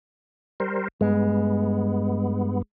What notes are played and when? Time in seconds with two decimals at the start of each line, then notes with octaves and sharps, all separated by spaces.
0.60 G3 A#4 C5
1.01 G2 G#3 B3